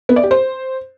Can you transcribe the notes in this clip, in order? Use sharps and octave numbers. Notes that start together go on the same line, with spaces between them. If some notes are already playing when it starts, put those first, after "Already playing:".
B3
D5
G4
C5